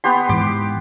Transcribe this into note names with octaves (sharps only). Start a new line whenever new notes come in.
B3 G4 C6
G#2 E3 D6